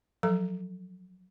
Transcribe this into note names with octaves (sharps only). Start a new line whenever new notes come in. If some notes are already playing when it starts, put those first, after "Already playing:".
F3 F#3 A4 A#5